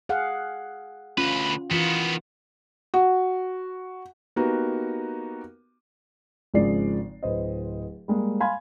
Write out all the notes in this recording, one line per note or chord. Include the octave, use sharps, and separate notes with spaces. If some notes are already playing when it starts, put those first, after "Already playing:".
G#4 F5 F#5
D2 C#4 F4 B4
D#3 E3 B3 F4
F#4
A#3 B3 D#4 F#4 G4
G#1 C#3 F3 G#3 D5 C7
D1 B4 C5 D#5
G3 G#3 A#3
F5 G#5 B5 C6 G#6